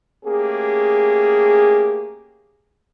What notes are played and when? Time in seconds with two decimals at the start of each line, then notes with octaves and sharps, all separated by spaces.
0.25 A3 A#3 C#4 G4 G#4